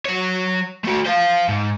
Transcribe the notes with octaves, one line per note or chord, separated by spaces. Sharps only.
F#3 C#5
A3 F#4
C5 F5
G#2